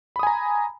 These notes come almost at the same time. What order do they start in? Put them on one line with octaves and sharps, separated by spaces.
B5 D#6 G#5 A#5